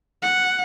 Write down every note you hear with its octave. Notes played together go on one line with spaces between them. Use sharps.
F#5